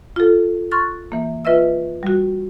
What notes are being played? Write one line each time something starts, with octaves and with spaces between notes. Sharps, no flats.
F4 A4
C6 C#6 F6 F#6 A6
E3 A#3
F4 B4 D#5 E5 E6
G3 F#4